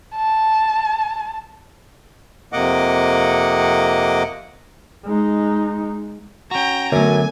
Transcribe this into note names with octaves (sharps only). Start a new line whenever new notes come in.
A5
F2 C3 A#3 D#5 F#5 D6
G#3 D#4
C#4 F#4 G5 A#5
F#2 D3 F#3 A3 B3 G#5